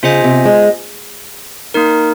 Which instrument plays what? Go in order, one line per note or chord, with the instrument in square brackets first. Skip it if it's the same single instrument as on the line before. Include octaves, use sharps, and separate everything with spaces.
[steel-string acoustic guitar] C#3 [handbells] F4 C5 D#5 G#5
[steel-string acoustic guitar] C3
G#3
[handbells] A#3 D#4 A#4